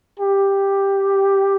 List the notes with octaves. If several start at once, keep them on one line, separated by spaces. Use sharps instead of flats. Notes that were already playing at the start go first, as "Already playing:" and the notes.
G4